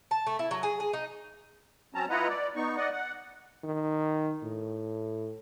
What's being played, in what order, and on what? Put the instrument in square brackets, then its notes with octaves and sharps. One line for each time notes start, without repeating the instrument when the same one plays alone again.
[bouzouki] A5
A3
E4
F#3
G#4
G#4
D#4
[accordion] F#3 C4 C#4 A5 A#5
E4 F4 B4 D#5 F#5 A#5
D5
B3 D#4 C#6
D5 D#5 F#5
F#5
[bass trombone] D#3
A2